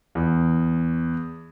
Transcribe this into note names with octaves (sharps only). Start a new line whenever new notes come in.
E2